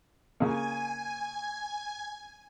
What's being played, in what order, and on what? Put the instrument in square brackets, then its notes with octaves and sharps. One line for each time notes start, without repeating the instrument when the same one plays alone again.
[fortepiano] C#3 A#3 [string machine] G#5